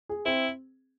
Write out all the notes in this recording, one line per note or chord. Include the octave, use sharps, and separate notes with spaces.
G#4
C4 E4